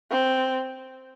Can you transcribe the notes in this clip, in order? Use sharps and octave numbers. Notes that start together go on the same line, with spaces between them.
C4